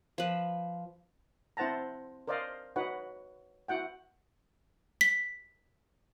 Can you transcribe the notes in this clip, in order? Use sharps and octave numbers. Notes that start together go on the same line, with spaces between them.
F3 B4
C4 E4 C5 F#5 A5 A#5
A#4 C5 D5 D#5 F5
D#4 F#4 B4 C#5 F#5
E4 F#4 F#5 G5
B6